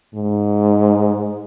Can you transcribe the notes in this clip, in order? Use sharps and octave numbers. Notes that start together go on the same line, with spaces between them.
G#2